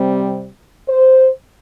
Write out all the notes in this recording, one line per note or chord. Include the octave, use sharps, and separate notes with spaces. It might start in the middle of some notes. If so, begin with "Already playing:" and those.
Already playing: C3 G3 C4
C5